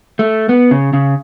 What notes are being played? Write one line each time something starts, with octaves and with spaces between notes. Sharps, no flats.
A3
B3
C#3
C#3